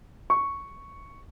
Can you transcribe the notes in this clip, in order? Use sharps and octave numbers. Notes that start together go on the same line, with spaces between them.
C#6